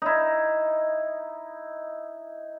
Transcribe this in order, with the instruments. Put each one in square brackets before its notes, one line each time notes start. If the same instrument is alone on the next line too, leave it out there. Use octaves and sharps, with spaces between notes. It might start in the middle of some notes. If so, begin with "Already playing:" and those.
[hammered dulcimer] D#4 E4